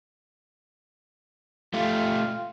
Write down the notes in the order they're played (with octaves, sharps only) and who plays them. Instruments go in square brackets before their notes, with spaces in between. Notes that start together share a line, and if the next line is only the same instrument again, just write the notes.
[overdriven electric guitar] A3 G4 [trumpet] F4